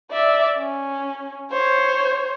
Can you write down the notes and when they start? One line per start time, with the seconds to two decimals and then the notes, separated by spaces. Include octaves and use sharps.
0.11 D5 E5
0.58 C#4
1.51 C5 C#5